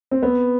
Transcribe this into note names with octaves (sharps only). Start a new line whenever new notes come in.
C4
B3